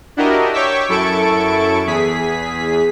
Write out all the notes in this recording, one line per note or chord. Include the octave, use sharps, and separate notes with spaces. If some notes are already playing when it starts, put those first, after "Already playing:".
D4 E4 F#4 G4 A#4 D#5
C#5 G5 C#6 D6 E6 B6
F#2 E4 A4 A5 C#6 D7
E2 G#4 B6